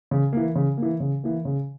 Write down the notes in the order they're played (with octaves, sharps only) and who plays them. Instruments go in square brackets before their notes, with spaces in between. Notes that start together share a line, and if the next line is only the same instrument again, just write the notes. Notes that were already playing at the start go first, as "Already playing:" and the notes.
[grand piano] C#3
E3 A#3
C#3
E3 A#3
C#3
E3 A#3
C#3